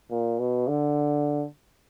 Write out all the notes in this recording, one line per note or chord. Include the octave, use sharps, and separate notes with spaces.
A#2
B2
D3